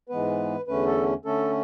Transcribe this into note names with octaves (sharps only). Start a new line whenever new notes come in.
G#2 E3 G#3 B3 B4
E2 D3 A3 C#4 B4
A4
D3 A3 C#4 A4